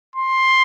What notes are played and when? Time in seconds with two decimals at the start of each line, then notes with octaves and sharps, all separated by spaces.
0.16 C6